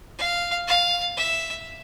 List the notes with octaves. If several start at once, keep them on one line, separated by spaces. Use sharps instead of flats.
F5
F5
E5